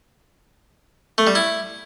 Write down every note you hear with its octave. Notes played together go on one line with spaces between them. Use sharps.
A3
G3
E4